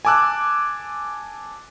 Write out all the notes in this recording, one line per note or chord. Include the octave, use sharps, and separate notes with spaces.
G#5 A5 D6 E6 F#6